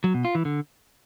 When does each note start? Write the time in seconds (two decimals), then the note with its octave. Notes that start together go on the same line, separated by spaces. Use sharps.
0.04 F#3
0.14 B2
0.25 F4
0.35 E3
0.45 D3